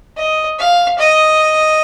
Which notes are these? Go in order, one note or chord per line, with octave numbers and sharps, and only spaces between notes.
D#5
F5
D#5